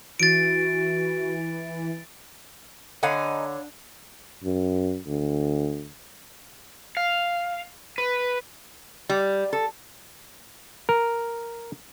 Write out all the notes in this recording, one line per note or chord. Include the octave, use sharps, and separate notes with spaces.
E3 F#4 A6 D7
D3 D#4 C#5 F5 F#5 G#5 B5
F#2
D2
F5
B4
G3
A4
A#4